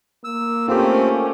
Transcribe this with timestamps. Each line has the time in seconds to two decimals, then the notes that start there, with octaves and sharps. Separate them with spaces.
0.24 A#3 E6
0.68 A3 C4 C#4 F4 G4